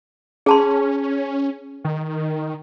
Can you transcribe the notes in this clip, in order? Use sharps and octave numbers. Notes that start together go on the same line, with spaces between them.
C#4 G#4 A5 C6
D#3